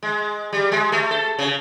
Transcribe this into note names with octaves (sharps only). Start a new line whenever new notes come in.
G#3
G3
G#3
A3
A4
C#3